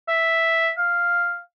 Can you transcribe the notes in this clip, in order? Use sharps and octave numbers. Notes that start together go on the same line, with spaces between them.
E5
F5